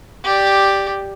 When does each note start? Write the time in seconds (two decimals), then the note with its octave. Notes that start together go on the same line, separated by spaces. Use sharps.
0.24 G4 D5